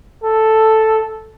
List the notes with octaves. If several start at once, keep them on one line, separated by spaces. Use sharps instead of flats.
A4